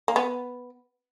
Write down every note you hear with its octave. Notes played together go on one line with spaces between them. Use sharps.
A#3
B3